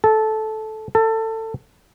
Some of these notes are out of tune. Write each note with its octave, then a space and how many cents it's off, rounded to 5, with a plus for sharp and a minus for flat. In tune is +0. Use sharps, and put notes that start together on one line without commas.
A4 -10
A4 +25